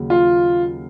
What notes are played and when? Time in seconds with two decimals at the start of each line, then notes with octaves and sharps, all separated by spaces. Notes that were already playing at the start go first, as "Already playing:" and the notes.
Already playing: D#2 C#3 F#3
0.10 F4